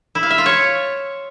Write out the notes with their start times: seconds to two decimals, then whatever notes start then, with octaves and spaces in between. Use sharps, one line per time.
0.15 E4
0.23 F5
0.30 E5
0.38 F4
0.46 C#5